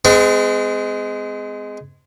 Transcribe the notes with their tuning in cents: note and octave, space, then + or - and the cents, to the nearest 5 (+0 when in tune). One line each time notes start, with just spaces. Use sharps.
G#3 +0 C4 -45